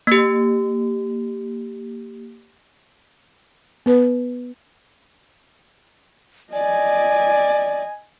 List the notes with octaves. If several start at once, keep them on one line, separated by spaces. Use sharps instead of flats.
A#3 G4
B3 B4
D5 D#5 G#5